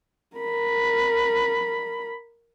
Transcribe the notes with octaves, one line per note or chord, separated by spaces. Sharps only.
A#4 B5